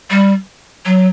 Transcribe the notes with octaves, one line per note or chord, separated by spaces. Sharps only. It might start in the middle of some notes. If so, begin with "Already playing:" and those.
G3
F#3